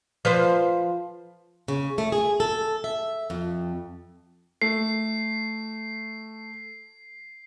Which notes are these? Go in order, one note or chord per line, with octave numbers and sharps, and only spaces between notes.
F3 B4 C5
C#3
A3
G#4
A4
E5
F2
A3 C7